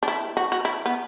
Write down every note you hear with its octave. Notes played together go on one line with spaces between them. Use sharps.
D4
E4
F#4
F#4
E4
B3